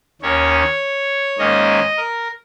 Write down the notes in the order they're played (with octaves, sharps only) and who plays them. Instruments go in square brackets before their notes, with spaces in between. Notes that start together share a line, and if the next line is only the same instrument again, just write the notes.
[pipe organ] D#2 D#3 C#4 C#5
G#2 D#3 A#3 C#4 D#5
A#4